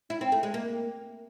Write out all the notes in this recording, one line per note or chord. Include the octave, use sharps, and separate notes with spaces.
E4
C4
A3
G#3
A#3